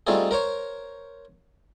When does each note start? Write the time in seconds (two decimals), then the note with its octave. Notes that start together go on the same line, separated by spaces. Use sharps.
0.07 G3 A3 C4 D#4 F4 G#4
0.31 A#4 C5 C#5